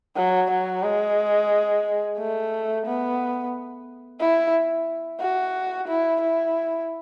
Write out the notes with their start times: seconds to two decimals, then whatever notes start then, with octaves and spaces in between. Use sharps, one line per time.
0.16 F#3
0.50 F#3
0.83 G#3
2.18 A3
2.86 B3
4.20 E4
5.20 F#4
5.88 E4
6.21 E4